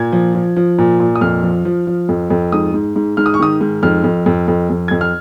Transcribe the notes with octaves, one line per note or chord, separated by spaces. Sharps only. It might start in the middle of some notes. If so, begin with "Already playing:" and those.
Already playing: A#2 G#6
F3
F3
F3
A#2
A#2
D#6
F2 F6
F3
F3
F3
F2
F2
G#2 D#6
G#2
G#2
G#2 F6
D#6
C#6
D#3 D#6
G#2
F2 F6
F2
F2
F2
F2
F2 G#6
F6